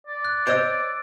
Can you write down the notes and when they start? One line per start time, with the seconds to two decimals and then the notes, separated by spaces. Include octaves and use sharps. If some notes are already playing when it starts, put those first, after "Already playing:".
0.07 D5
0.25 F#6
0.47 C5 C#5 D#5 E6 D7